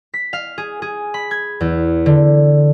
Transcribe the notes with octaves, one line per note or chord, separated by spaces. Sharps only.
B6
F5
G#4
G#4
B5
G#6
E2
D3